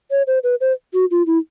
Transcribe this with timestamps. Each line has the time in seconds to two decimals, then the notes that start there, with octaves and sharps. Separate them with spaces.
0.11 C#5
0.27 C5
0.44 B4
0.61 C5
0.93 F#4
1.11 F4
1.27 E4